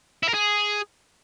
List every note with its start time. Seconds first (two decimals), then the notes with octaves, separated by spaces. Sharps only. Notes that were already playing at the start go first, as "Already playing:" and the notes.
0.23 E4
0.29 A#4
0.34 G#4